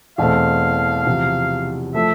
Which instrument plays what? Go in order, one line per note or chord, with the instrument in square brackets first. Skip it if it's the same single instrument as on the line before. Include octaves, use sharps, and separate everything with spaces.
[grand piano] E2 B2 A3 C4 [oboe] F5
[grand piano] E2 C3 F3
[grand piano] F3 A3 [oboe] E5